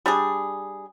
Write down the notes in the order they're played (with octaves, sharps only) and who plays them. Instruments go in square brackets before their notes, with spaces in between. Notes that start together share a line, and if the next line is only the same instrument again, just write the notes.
[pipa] G3 D4 G#4